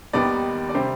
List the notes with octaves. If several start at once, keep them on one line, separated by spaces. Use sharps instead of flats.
D#2 D#3 G3 B3 D5
D5
C3 G3 C5